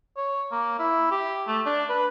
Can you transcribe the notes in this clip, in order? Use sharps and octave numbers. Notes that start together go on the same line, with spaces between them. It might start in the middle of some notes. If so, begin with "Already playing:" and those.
C#5
A#3
E4
G4
A3
D4
B4